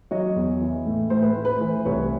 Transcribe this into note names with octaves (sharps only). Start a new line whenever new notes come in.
F#3 C#5 D#5
E2
E3
A2
A2 C5
B4
A2
B4
E3 C5
C2 B4 C#5